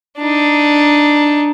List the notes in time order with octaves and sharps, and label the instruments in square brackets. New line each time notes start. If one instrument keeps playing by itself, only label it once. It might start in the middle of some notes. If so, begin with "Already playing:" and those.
[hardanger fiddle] D4 D#4